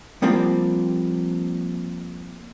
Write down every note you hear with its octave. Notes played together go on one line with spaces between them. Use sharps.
F3 G3 A#3 C4 F4 G4